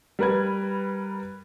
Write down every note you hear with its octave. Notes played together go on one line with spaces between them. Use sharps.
G3 A#4 B4 G#6